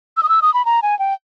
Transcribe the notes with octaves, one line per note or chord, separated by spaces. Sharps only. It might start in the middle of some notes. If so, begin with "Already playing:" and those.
E6
D#6
E6
D#6
B5
A#5
G#5
G5